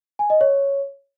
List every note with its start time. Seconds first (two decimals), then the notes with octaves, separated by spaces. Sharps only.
0.19 G#5
0.30 D#5
0.41 C#5